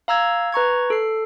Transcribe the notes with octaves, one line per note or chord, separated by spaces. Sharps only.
F5 A#5 E6 G#6
B4 A#5 C#6 G#6
A4 C7